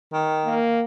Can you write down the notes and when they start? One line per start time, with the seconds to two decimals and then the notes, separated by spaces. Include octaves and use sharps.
0.13 D#3
0.46 A#3